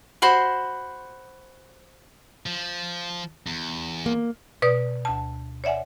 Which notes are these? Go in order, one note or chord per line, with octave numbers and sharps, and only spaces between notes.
F#4 C5 B5 C6
F3
E2
A#3
B2 B4 D5 D#6
D2 A5
C#5 D5 E5 F#5 G#5